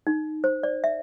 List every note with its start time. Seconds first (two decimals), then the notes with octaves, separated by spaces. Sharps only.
0.07 D#4
0.44 C5
0.63 D5
0.84 E5